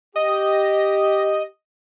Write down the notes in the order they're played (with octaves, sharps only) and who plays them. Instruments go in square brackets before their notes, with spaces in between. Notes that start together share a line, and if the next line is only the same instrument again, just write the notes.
[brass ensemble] G4 [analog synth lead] D#5